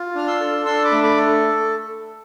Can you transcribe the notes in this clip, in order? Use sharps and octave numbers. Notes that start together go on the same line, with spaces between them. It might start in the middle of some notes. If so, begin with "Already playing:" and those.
Already playing: F4
D4 F6
C6 E6
A4
D4 C6 E6
B5 D6
A3
B5 D6
A4